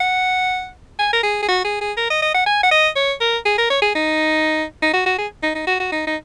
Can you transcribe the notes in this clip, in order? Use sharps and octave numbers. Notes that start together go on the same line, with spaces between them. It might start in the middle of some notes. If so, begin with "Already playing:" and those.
F#5
G#5
A#4
G#4
G#4
F#4
G#4
G#4
A#4
D#5
D#5
F#5
G#5
F#5
D#5
C#5
A#4
G#4
A#4
C#5
G#4
D#4
D#4
F#4
F#4
G#4
D#4
D#4
F#4
F#4
D#4
D#4